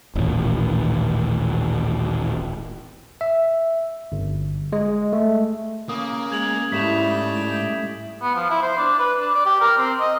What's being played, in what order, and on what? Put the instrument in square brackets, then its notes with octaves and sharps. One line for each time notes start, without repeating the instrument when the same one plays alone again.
[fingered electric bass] D#1 A1
[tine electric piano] E5
G1
G#3
A3
[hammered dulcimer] C#3 [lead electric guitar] A#3 [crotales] D#6
[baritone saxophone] G#3 [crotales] G#6 F7 F#7
[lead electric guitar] G#2 [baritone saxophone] G3 [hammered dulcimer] A3 E4 [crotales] B6 E7 F7
[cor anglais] B3
F3
E4
C5
D4
B4
D4
D5
G4
A#4
C4
D#5